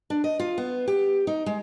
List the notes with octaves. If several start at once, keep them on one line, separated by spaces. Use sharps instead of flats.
D4
D#5
F4
B3
G4
D#4
G#3